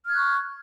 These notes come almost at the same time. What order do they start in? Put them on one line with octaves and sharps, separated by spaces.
F6 G#6 F#6 C#6